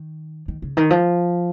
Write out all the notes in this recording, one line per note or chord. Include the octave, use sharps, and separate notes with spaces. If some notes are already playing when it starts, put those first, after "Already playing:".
Already playing: D#3
D#3
C#3
D#3
F3